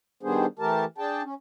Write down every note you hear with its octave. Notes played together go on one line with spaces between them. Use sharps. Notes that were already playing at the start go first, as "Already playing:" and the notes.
D#3 G3 B3 D4 G#4 C5
E3 A3 G4 A#4 A5
D4 G#4 G5 A5
C#4